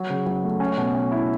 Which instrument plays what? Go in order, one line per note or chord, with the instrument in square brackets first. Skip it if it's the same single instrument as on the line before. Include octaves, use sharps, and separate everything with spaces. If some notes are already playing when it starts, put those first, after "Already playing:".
Already playing: [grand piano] F#3
C#3
F#3
A3
C#4
B2
C#4
E4